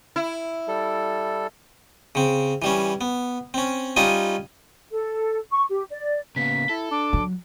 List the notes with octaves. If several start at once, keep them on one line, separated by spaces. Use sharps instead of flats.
E4
G3 A4
C#3 C4
E3 G3 C#4
B3
C4 C#4
G3 C#4 D#4 F4 D#5
A4
C#6
G4
D5
C#3 A#3 B3 B6
E4 A4
D4 D6
F#3